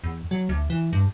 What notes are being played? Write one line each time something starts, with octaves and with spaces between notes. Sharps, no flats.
E2
F#3
D2
E3
G2